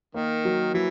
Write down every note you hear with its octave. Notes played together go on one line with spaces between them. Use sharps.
D#3 A#3
F#3
E3 F#3